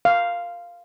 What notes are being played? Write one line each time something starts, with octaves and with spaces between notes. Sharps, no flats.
F5